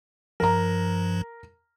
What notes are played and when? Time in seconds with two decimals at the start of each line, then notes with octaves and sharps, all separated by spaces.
0.40 G2 F3 A#4 A#5